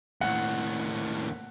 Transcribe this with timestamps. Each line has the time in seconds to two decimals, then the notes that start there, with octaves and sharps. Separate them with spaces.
0.21 D#2 A2 F#5